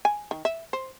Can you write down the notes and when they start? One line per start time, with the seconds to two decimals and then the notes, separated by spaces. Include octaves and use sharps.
0.05 G#5
0.31 D#3
0.45 E5
0.73 C5